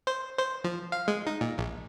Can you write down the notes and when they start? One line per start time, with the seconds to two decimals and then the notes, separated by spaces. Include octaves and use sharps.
0.07 C5
0.39 C5
0.64 F3
0.92 F5
1.08 G#3
1.27 D#4
1.41 A#2
1.58 A#1